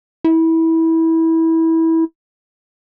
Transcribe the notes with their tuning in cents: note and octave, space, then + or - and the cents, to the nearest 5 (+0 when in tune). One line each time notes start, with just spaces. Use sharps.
E4 -20